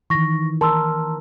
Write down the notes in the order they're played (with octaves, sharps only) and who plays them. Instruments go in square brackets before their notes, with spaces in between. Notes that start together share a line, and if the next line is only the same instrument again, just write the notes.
[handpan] D#3 E3 [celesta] C#6 A#6
[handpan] A#4 [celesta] A5 C6 E6